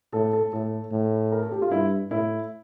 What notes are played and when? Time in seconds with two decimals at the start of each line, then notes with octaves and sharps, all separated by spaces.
0.13 A2 A4
0.33 A4
0.53 A2 A4
0.92 A2
1.32 A#4
1.43 A4
1.52 G4
1.62 F4
1.71 G2 E4
2.11 A2 E4